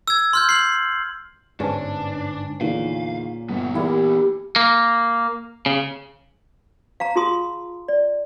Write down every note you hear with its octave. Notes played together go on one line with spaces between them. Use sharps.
E6 G#6
C6 F6 G6
C7 F#7
G1 G#2 C#4 D4 B4 C#5 A5
E2 A#2 D3 D#3 F5
G1 B3 D#4
E3 G3 E4 G4 A#4
A#3
C#3
F5 A5 A#5
F4 G#4 A5 C6 D#6
D5